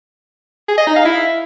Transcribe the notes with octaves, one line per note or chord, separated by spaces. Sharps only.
G#4
D#5
D#4
F5
E4